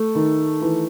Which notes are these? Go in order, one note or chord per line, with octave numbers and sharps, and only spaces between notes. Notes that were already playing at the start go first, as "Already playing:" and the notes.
Already playing: A3
D#3
E3